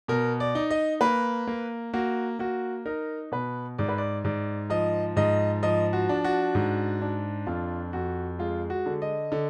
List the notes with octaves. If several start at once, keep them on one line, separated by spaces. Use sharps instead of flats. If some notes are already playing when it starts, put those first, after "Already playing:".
B2 A#4
D5
D#4
D#5
A#3 B4
A#3
A#3 F#4
A#3 F#4
D#4 A#4
B2 B4
G#2 D5
B4
D5
G#2 D5
F3 D#5
G#2 D#5
F3 D#5
F#4
D4
F#4
G#2
D4
F2 F4
F2 F#4
G#3 F4
F#4
D3
D#5
D3